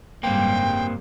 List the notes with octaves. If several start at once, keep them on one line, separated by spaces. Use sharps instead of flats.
F#1 G#2 G3 A#3 C4 G5